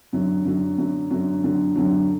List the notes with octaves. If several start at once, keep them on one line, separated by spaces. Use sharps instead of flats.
F#2 D3 F#3
F#2 D3 F#3
F#2 D3 F#3
F#2 D3 F#3
F#2 D3 F#3
F#2 D3 F#3